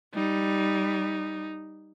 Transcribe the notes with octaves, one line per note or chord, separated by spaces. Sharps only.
G3 D#4